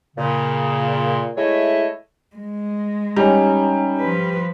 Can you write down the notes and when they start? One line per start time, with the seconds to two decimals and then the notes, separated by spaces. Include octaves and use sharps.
0.17 A#2 C#3
1.37 G#3 A3 E4 C#5 D#5 E5
2.36 G#3
3.16 G3 C#4 D#4 A#5
3.99 F3 B4